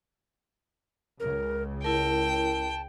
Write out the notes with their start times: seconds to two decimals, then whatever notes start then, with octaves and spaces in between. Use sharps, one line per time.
1.20 C#2 C#3 A#4
1.84 E4 A#4 G5 A5